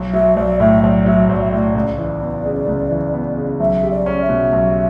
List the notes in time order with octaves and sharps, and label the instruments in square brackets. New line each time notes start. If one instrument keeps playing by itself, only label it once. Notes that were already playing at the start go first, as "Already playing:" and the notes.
Already playing: [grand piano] B1
[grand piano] F#3 [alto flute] E5
[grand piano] B1 [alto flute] D5
[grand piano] A2 [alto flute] E5
[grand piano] B1 [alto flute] D5
[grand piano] F#3 [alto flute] E5
[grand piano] B1 [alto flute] D5
[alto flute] E5
[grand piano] A2 [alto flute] D5
[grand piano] C#2 [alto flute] D5
[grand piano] E3
B3
C#3
C#2
E3
B3
C#3
[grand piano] B1 [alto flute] E5
[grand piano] G3
[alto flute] D5
[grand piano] C#4
[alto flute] E5
[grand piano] B2
B1